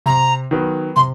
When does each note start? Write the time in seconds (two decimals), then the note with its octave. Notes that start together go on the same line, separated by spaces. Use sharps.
0.06 C3 A#5
0.51 D#3 F#3 B3
0.96 C3 C6